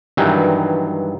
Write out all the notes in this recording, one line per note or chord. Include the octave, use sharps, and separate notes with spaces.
G2 D#3 E3 F#3